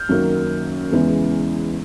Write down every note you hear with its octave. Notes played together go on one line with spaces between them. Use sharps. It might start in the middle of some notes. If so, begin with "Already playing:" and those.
Already playing: F6 G6
F#2 D#3 F#3 A#3
E2 C#3 E3 G#3 B3